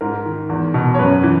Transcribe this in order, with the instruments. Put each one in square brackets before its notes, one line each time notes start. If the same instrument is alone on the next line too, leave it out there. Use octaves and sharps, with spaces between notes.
[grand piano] G#2 A#4
D#3
E2
B2
C#5
F#2 B4
E3